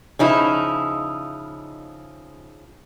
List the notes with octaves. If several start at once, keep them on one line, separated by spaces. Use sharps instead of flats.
C#3 F3 D#4 E4